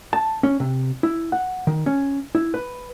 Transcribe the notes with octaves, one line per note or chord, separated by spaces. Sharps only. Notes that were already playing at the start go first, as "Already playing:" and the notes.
A5
C#4
C3
E4
F#5
D#3
C#4
E4
B4